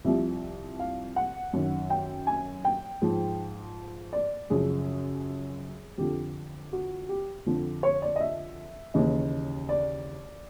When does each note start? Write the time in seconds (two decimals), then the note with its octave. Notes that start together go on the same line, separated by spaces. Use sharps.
0.04 C2 C3 F3 E5
0.79 F5
1.16 F#5
1.53 F#2 D#3
1.90 G5
2.27 G#5
2.65 G5
3.02 G#2 F3
4.13 D5
4.50 F#2 C#3 F3 G#4
5.98 F2 D3 F3 G4
6.73 F#4
7.09 G4
7.46 F2 D3 F3
7.83 C#5
8.02 D5
8.16 D#5
8.21 E5
8.94 D#2 C#3 E3 D#5
9.69 D5